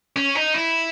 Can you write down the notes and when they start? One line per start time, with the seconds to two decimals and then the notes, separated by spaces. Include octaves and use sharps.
0.16 C#4
0.35 D#4
0.54 E4